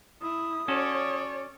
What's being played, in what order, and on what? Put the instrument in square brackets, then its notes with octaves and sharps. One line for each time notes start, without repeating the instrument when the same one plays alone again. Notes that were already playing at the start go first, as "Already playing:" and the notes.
[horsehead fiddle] E4 [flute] D#6
[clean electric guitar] C#4 F#4 A4 [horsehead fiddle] C#5 D5